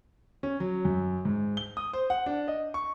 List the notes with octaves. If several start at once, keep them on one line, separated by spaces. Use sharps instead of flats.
C#4
F#3
F#2
G#2
G7
D#6
C5
F#5
D4
D#5
C#6